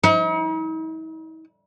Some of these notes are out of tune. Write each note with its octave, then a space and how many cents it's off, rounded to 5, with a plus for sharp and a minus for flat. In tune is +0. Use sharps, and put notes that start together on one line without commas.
D#4 +45